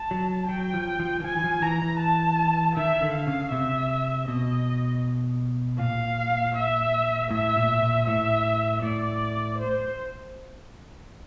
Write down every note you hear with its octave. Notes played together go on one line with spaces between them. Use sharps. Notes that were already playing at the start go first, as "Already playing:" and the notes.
Already playing: A5
F#3
F#3 G5
F3
F3
E3
F3 G#5
E3
F3
E3 A#5
E3
A5
D#3 E5
D3
F5
C#3
C3 E5
B2 D#5
A#2 F5
E5
A2 E5
A#2
A#2
A2 E5
A2 D5
C5